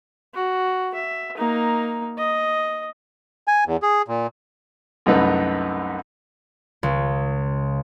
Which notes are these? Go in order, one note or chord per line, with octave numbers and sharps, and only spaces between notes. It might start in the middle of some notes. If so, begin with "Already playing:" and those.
F#4
E5
A#3 D#4
D#5
G#5
E2
G#4
A#2
C2 F#2 A3 D#4 B4
C#2